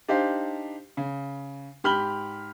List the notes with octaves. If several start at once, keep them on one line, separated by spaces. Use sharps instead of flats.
D4 D#4 G4 C5 F5
C#3
G#2 G4 B5 F6 F#7 G7